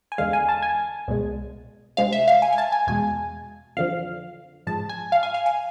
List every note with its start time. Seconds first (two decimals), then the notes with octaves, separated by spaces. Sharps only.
0.12 G#5
0.18 E2 D3 G#3 F5
0.33 G#5
0.49 A5
0.63 G#5
1.08 C2 B2 G#3
1.97 D2 C3 G#3 F5
2.13 E5
2.28 F5
2.42 G#5
2.53 G#5
2.58 A5
2.72 G#5
2.87 E2 B2 G#3 G#5
3.77 F2 D3 F3 F5
4.66 G#2 F3 G#3 A5
4.89 G#5
5.12 F5
5.23 G#5
5.34 F5
5.46 G#5